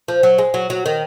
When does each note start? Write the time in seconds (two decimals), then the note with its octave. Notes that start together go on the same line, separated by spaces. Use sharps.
0.08 F3
0.23 F#3
0.38 G#3
0.54 F#3
0.70 F#3
0.86 D#3